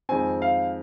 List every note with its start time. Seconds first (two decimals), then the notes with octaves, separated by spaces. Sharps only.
0.09 F2 D#3 G#3 C4 G#5
0.42 F5